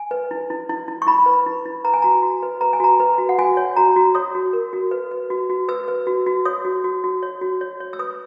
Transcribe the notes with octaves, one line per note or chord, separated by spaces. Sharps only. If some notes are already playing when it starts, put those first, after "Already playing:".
Already playing: G#5
B4
E4
E4
E4
E4
C#6
E4 B5
B4
E4
E4
B4 A#5
G#5
F#4 A#5
F#4
B4
B4 A#5
G#5
F#4 A#5
B4
F#4
F#5
F#4 G#5
C#5
F#4 A#5
F#4
C#5 D#6
F#4
A#4
F#4
B4
B4
F#4
F#4
B4 E6
B4
F#4
F#4
C#5 D#6
F#4
F#4
F#4
C#5
F#4
C#5
C#5
E6
B4 D#6